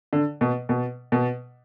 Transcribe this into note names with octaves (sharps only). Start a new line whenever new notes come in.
D3
B2
B2
B2